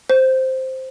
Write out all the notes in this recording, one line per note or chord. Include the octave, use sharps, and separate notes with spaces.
C5